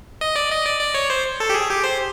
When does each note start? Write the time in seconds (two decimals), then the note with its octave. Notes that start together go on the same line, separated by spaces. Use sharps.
0.21 D#5
0.36 D5
0.51 D#5
0.66 D5
0.81 D5
0.95 C#5
1.10 C5
1.40 A4
1.50 G4
1.54 G#4
1.70 G4
1.84 C5